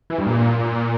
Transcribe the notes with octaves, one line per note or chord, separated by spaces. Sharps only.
E3
G2
A#2